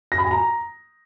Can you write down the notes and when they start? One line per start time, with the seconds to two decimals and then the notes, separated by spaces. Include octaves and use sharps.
0.12 A#6
0.18 B5
0.25 G#5
0.31 A#5